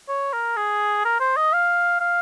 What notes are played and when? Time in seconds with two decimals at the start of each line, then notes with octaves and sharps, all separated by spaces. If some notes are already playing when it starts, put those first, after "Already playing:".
0.09 C#5
0.33 A#4
0.57 G#4
1.05 A#4
1.20 C5
1.37 D#5
1.53 F5
2.00 F5